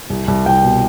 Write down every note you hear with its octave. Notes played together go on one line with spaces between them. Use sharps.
C2
C2
C2 G5
B2